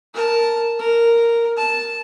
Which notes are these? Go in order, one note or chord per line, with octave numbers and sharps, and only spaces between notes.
A#4 A5
A#4
A5